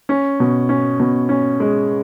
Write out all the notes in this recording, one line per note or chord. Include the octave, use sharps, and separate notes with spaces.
C#4
B2
C#4
B2
C#4
G#3